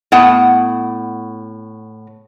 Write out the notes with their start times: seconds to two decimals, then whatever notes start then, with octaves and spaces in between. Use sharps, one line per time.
0.12 A2 B3 F#5